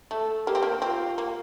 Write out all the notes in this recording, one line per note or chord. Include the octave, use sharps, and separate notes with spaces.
A3 A4
A#3 G4
C4
A#3
C4 F4
A#3